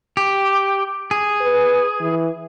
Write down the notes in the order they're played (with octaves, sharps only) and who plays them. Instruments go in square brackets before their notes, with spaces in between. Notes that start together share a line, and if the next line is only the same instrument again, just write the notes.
[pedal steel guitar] G4
G#4
[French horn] B4
E3